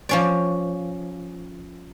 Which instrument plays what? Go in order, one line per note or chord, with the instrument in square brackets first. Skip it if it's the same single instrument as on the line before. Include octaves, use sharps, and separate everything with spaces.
[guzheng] F3 C#4 D5